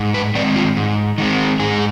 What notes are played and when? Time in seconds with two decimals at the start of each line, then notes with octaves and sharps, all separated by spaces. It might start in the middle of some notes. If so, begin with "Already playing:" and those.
Already playing: G#2
0.14 B4
0.35 D#3 G#3 C4 D5
0.56 F4
0.77 G#2
1.18 D#3 G#3 C4
1.59 G#2 G#4